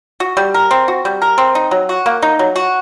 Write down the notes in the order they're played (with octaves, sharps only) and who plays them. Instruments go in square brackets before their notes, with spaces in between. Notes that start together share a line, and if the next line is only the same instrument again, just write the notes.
[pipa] F#4
G3
A#4
C4
F#4
G3
A#4
C4
D#4
F#3
F#4
A#3
D#4
F#3
F#4